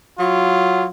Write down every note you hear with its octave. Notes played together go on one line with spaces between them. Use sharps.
F#3 F4